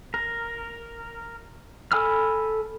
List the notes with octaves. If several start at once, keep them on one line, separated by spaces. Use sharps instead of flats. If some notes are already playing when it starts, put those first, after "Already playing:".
A#4
A4 G#5 B5 E6 F6